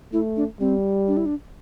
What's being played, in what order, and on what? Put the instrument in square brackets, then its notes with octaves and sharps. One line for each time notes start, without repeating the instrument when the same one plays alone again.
[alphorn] A3 [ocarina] E4
[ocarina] D4
[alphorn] G3 [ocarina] C4
[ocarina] D4
E4
D4